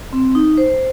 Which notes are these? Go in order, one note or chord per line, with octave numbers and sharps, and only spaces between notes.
C4
D#4
C5